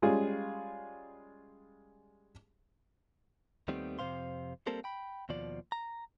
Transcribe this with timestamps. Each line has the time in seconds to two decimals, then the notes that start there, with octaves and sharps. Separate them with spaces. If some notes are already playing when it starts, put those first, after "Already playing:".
0.02 G3 G#3 C#4 F4 G#4
3.68 D#2 D#3 G3 A3 B3 C4
3.99 F2 C3 D#3 C5 F5 C6
4.67 G3 A#3 C4 A4 A#4 C5
4.84 G5 B5
5.29 D#2 B2 F3 D5
5.72 A#5